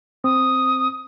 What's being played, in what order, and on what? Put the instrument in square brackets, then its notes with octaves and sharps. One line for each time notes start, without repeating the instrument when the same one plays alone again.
[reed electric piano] C4 [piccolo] D#6